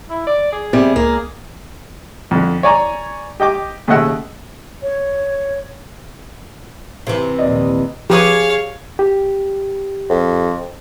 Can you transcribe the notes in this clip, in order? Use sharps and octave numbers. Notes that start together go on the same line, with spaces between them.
E4
D5
G#4
C3 G3
C#2 A#3
F2 D3
C#5 D5 G#5 A#5
G4 D#5 G5 D6
D#2 C#3 A3 D#5 F#5 E6
C#5
C3 E3 C5
A#1 D#2 D5 D#5
F3 G4 G#4 B4 C#5 F5 D#6
G4
F2